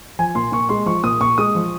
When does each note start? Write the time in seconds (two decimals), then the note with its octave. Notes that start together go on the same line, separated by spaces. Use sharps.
0.19 F3 G#5
0.35 A#2 C6
0.52 A#2 C#6
0.69 G#3 C6
0.86 F3 C#6
1.03 A#2 D#6
1.21 A#2 C#6
1.38 G#3 D#6
1.55 F3